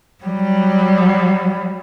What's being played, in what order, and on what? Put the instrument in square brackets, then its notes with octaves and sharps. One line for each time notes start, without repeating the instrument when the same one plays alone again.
[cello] F#3 G3